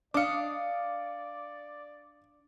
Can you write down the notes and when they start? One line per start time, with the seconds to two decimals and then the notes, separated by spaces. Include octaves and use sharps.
0.14 D4 D5 D#5 F5 D6 C#7